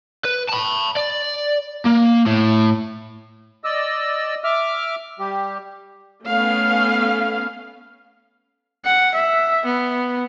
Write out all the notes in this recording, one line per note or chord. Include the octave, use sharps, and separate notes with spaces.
B4
A5 B5
D5
A#3
A2
D5 D#5 E6
E5 D6 F6
G3 G4
A3 B3 C#4 F5
F#5
E5
B3